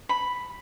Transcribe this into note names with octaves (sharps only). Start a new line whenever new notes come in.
B5